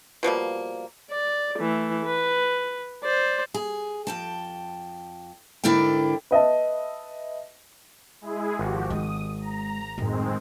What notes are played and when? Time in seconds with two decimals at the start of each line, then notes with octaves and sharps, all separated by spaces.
0.23 B2 F3 G3 A#3
1.11 D5
1.59 E3 A3
2.05 B4
3.04 C5 D5
3.54 G#4
4.07 F2 G5 A5
5.64 G#2 D3 E4 A#4 D5 G5
6.31 B4 D#5 E5 A5
8.21 G#3 E4 G#4
8.59 G#1 F3 F#4 G4
8.90 D#3 G#3 D#6
9.41 A#5
9.98 F#2 A2 D#3 G#3 C4